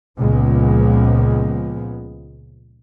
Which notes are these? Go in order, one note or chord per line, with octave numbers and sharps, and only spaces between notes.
C#2 A#2 F3 G#3 B3